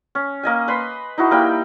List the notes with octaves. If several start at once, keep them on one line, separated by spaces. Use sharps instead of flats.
C#4
A#3 D#5 G#5
B4 B5 C6
D#4 E4 F#4
G3 A#3 G5 B5